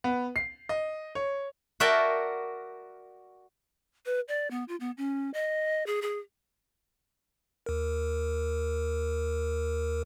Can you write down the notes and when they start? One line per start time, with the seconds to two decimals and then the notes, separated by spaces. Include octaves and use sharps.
0.04 B3
0.36 C7
0.69 D#5
1.15 C#5
1.80 F#4 A#4 D5 E5 G5 A5
4.06 B4
4.28 D5
4.51 B3
4.68 F4
4.80 B3
4.97 C#4
5.34 D#5
5.86 G#4
6.02 G#4
7.66 D#2 A#4